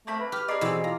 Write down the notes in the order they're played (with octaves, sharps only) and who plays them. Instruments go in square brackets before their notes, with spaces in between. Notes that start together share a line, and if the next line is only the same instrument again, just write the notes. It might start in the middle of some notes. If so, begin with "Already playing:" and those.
[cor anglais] A3 [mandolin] A#3 C4 B5
[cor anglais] B4
[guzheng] G4 [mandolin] F6
[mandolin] G#4 A#4 D5 [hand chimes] D#5 C7
[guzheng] B2 E3 B3 [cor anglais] C4
[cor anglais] F4 [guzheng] A#5